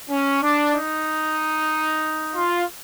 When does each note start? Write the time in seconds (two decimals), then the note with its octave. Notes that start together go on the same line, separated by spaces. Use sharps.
0.10 C#4
0.42 D4
0.75 D#4
2.35 F4